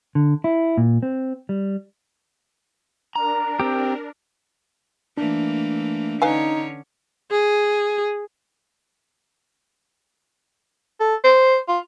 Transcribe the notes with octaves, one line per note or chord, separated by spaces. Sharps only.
D3
E4
A#2
C4
G3
D4 A#4 A#5
C4 G4
E3 A3 A#3 D4
D3 C#4 D#4 B4 C#5 F5 G#5
G#4
A4
C5
F4